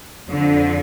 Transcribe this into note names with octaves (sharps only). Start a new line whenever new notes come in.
F2 D3 F3